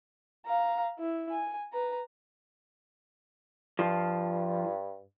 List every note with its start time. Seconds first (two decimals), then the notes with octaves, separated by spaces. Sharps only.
0.46 F5 A#5
0.99 E4
1.31 G#5
1.73 B4 A#5
3.79 G2 F3